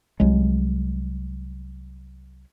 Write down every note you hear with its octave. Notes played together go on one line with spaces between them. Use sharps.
C2 F#3 G#3